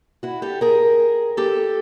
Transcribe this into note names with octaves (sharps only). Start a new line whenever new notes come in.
E4 F#4
G4 A4
G#4 A#4
G4 A4